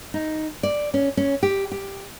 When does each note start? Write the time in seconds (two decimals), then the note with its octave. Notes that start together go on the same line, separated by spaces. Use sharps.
0.14 D#4
0.63 D5
0.94 C#4
1.17 C#4
1.43 G4
1.72 G4